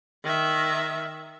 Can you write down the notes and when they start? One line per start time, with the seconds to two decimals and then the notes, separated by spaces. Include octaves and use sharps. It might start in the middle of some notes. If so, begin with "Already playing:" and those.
0.24 D#3 E5